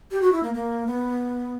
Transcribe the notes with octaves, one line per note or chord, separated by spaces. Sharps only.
G4
F#4
E4
A#3
A#3
B3